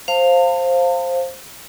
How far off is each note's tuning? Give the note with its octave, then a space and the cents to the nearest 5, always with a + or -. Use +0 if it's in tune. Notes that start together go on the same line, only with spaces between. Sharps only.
C5 +10 F5 +0 A5 +40